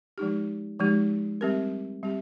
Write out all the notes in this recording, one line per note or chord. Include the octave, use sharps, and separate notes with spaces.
F3 G#3 D#4 G4
F3 G#3 D#4 G4
G3 C4 G4 A#4
G3 C4 G4